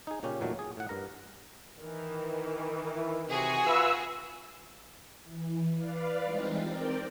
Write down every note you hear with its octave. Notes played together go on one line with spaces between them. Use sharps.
D#4 G#4
A#2 C#3 C#4 G4
E2 A#2 D#3 F#3 A3
G#4
A2 F#5
G2 A#4 A#5
D#3 E3
E4
C3 F#4 G#4
F4 B4 E5 E6
E3
B4 D5 F5
E3 G3 G#3 C4 D#4 F4
C4 A#4 D5 G5